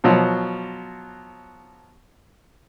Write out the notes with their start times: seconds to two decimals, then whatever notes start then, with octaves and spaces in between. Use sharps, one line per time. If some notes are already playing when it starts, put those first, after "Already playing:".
0.04 B2 F3 F#3